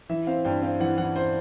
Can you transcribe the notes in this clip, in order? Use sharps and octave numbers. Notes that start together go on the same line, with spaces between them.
E3 E5
C4 F5
G2 G5
C4 F5
E3 F#5
E3 F#5
C5